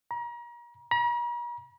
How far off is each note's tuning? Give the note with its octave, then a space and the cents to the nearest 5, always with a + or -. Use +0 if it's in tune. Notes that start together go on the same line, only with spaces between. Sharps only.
A#5 +35
A#5 +45